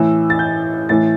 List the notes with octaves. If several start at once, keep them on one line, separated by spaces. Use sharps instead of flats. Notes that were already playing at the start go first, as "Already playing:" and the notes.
Already playing: A2 E3 E6
A6
G6
A2 E3 A6